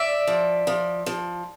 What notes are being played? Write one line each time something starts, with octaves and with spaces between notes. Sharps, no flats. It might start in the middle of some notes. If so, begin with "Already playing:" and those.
Already playing: D5 E5
F3
F3
F3